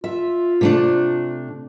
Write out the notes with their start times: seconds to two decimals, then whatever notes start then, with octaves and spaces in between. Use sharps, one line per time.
0.04 F4 E5
0.61 C3 A3 D4